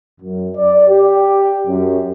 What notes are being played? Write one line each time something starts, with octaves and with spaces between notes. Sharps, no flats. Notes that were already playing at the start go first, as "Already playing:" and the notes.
F#2
D5
G4
F#2